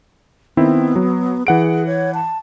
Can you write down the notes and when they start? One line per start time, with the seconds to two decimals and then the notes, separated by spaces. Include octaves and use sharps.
0.57 D#3 B3 C4 E4
0.96 F#3
1.47 E3 G#4 F#5 D7
1.87 C#5
2.14 A5